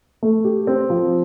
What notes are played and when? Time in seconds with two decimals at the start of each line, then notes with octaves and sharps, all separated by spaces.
0.23 A3
0.45 G4
0.67 C4
0.90 F3